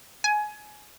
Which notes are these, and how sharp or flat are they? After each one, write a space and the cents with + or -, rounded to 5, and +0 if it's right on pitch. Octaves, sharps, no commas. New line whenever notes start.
G#5 +20